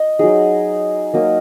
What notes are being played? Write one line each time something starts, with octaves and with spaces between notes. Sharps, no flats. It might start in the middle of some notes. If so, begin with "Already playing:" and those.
Already playing: D#5
F#3 D#4 G#4
F#3 A#3 D#4